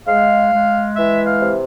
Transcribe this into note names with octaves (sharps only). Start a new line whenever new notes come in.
G#3 F5
G#3
E3 E5
F5
C3